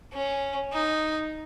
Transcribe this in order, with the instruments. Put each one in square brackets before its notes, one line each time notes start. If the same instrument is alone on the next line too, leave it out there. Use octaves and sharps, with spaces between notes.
[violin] C#4
D#4